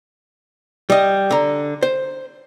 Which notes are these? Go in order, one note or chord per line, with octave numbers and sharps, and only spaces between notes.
G3 D#5
D3 A#5
C5